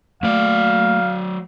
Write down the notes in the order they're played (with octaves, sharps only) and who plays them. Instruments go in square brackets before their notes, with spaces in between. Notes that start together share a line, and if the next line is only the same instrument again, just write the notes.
[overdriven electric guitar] F#3 D5 [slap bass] A3 A#3 [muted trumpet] F5